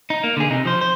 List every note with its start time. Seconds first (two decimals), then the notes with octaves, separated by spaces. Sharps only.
0.10 D#4
0.24 A#3
0.37 D3 G#4
0.50 C3 D#4
0.65 F3 C5
0.81 C5